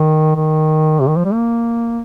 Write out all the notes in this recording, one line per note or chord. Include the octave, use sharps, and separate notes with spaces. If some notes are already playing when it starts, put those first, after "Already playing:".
Already playing: D#3
D#3
C3
D#3
F3
G3
A#3